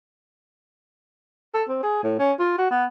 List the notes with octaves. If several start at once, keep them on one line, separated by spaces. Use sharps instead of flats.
A4
C4
G#4
A2
C#4
F4
F#4
B3